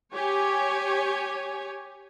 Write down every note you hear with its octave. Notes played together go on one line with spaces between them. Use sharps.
G4 C#5 G#5